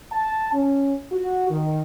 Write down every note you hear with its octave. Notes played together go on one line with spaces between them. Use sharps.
A5
C#4
F#4
D#3